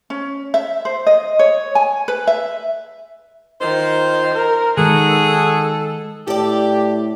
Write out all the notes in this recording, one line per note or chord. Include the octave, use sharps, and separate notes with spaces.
C#4
E5
C5
D#5
C#5
G#5
B4
E5
D#3 F4 C5
A#4
D#3 G#3 F#4 G#4 A4
A2 G4 A4 D5